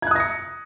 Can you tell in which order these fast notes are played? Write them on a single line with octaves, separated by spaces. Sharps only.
G#6 F#6 D#6 A#6 C#7